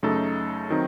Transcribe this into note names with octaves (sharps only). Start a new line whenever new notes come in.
F#2 C#3 A3 D#4 A4
D#3 F#3 C4 D#4